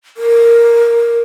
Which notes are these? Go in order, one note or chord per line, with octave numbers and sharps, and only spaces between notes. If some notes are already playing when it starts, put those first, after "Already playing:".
A#4